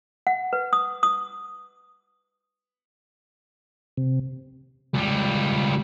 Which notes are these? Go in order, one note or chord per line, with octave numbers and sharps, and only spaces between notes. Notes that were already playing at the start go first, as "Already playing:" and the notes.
F#5
B4
D#6
D#6
C3
C#2 G3